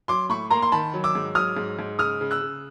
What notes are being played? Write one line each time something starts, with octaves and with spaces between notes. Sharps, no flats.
F#3 C6 D6
A2 B5 C#6
A#3 A#5 C6
C6
D#3 A5 B5
F#3
D6 E6
G#2
F#3 D#6 F6
G#2
G#2
C#3 D#6 F6
C#3
E6 F#6
C#3